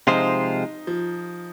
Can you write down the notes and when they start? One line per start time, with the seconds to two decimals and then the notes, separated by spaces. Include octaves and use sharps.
0.07 C3 F3 G#3 D#4 F4 C5
0.87 F3